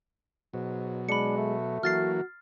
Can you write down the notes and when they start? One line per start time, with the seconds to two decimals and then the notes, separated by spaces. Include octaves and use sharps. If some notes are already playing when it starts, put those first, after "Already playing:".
0.54 G#2 B2 F#3
1.09 G#3 D4 B5 C#7
1.37 A3
1.83 E3 F#3 A#3 F#4 F6 A6 C7